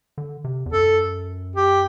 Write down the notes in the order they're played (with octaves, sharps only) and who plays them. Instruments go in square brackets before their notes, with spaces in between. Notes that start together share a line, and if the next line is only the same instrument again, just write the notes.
[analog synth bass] D3
C3
E2
[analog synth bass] F#2 [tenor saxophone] A4
[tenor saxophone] G4